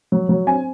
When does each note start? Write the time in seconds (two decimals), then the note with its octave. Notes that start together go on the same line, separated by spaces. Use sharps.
0.12 F#3
0.29 F#3
0.47 C4 G#5